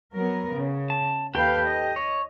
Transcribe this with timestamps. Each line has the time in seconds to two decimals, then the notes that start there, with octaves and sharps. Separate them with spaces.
0.14 F#3 B3 A#4
0.54 C#3
0.90 A5
1.35 D#2 G4 A4 B4 F5 G5
1.66 D#5
1.96 C#5